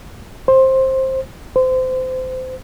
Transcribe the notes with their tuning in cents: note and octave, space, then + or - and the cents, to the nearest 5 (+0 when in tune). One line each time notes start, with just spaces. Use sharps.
C5 +15
C5 -25